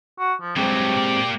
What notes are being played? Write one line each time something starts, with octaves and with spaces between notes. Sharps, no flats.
F#4
F3
G2 C3 F#3 G#3 C4 G4
A#3 D5